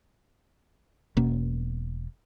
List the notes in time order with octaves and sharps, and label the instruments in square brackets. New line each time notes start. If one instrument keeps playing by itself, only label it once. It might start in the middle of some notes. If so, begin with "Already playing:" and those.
[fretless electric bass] E1 B2 A#3 C#4